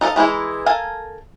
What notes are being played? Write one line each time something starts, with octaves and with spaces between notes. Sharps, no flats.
D#4 A4 A#4 D#5 F5
E3 G#3 D#4 E4
A4 A#4 F5 G#5